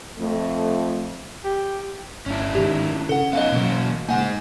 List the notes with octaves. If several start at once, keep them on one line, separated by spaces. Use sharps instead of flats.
F2 A3
G4
G1 C#4 D4 E4
G#2 D#3 G4
C#3 A4 F#5
B3 C#4 D#4 D#5 F5
B2 E3 F#3 A#3 C#4 F#4
C#3 G#3 A#3 D#4 F#5 G#5